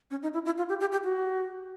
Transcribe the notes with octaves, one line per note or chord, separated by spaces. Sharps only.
C#4
D#4
E4
E4
F4
G4
G4
G4
F#4